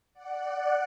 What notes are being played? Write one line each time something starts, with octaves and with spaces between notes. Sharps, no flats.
D5 F#5